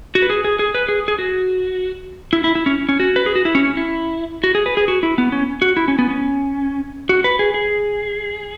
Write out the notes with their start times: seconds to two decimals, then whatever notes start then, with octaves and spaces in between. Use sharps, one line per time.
0.15 F#4
0.22 B4
0.30 G#4
0.44 G#4
0.59 G#4
0.75 B4
0.89 G#4
1.08 G#4
1.19 F#4
2.33 E4
2.44 E4
2.55 E4
2.66 C#4
2.89 C#4
3.00 F#4
3.16 B4
3.26 G#4
3.35 F#4
3.45 E4
3.55 C#4
3.77 E4
4.44 F#4
4.55 G#4
4.66 B4
4.77 G#4
4.88 F#4
5.03 E4
5.18 B3
5.32 C#4
5.62 F#4
5.77 E4
5.88 C#4
5.99 B3
6.10 C#4
7.09 F#4
7.24 B4
7.39 G#4
7.54 G#4